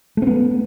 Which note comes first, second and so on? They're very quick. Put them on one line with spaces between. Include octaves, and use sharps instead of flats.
A3 C4 B3